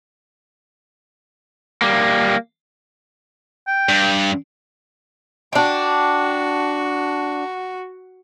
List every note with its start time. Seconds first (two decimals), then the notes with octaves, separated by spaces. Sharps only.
1.82 G3 A#3
3.67 G5
3.89 G2
5.53 D4 F#4 G5